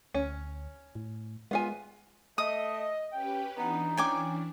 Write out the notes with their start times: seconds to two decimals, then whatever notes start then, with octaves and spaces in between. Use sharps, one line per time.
0.14 D2 C#4
0.95 A2
1.51 G#3 B3 F4 G#5
2.38 A3 D#5 D#6
3.12 C#4 G4 B4 G5
3.57 E3 B3 D4 D#4
3.97 C#4 G5 G#5 D6